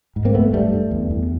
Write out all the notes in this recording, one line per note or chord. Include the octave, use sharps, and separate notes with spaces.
G#2
A#3 C4
G#2 A3 B3
G2 G3 A3
G2
E2
E2